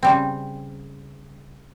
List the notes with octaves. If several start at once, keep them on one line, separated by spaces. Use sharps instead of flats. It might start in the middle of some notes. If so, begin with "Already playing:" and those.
C#3 G3 C4